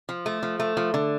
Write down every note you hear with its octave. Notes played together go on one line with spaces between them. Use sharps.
F3
A3
F3
A3
F3
D3